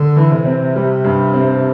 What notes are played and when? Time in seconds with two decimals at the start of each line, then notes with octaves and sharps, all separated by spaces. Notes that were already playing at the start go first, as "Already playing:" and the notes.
Already playing: D3
0.17 E3
0.31 C3
0.45 C4
0.76 G3
1.04 G2
1.34 C4